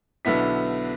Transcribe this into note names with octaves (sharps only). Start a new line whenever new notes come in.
B1 D3 B3 E4 B6